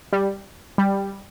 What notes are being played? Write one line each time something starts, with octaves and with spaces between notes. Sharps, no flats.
G3
G3